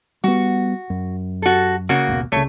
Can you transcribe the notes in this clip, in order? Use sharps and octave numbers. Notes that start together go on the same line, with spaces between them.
G3 B3 F#4
F#2
F#4 A4
C#3 A#3 F#4
G#1 D#2 B2
C2 C#3 A3 C#5